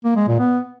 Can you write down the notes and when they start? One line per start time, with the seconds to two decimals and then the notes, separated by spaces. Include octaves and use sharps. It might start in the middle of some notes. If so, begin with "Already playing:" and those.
0.04 A#3
0.16 G#3
0.28 A#2
0.39 B3